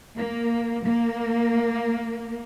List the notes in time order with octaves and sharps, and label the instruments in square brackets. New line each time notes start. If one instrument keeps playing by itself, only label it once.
[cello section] A#3
A#3